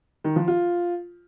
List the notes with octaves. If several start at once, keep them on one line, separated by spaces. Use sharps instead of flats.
D#3
F3
F4